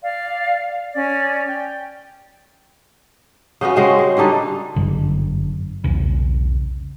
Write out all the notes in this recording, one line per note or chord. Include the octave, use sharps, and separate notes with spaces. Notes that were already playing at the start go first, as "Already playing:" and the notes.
D5 F5
C#4 D5
G5
C#3 B3 C#4 F#4
C#3 G#3 C4
G#3
D3 G3 D4 D#4
G1 F#2 D3
B1 E2 C#3